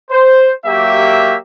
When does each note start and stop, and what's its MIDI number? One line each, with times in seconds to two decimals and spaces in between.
0.11 0.51 72
0.66 1.35 54
0.66 1.35 58
0.66 1.35 67
0.66 1.35 76